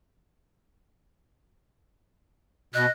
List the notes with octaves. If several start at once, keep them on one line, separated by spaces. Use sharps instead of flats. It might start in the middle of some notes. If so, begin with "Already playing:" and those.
B2 D#5 F#6